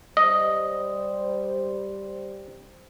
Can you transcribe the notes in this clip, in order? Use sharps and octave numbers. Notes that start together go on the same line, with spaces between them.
G3 C5 D#5